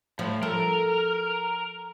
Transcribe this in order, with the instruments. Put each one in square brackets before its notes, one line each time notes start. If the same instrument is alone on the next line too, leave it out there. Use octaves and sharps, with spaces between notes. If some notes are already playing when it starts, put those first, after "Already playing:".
[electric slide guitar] A2 [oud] F3
[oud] A4 [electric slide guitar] A#4